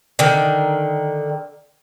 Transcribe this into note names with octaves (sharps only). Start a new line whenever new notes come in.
D3 D#3